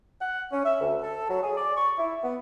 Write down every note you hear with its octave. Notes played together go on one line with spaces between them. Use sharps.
F#5
C#4
E5
D2
A4
F#3
G#4
D5
C#6
E4
B3